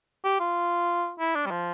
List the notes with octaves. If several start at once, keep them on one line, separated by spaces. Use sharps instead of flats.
G4
F4
E4
D4
G3
F3